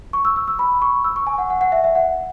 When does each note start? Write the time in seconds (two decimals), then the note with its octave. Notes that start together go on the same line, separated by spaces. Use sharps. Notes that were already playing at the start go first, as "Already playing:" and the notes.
0.13 C#6
0.25 E6
0.36 E6
0.48 E6
0.59 B5
0.82 C#6
1.04 E6
1.16 C#6
1.27 G#5
1.38 F#5
1.50 F#5
1.61 F#5
1.72 E5
1.84 E5
1.95 F#5